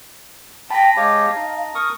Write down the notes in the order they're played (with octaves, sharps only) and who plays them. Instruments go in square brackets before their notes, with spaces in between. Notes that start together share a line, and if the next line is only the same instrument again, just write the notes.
[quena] G5 [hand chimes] A5 A#6 [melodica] B5
[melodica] G#3 G4 C#5 [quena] F5
[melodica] D#4
A#4 C#6 D#6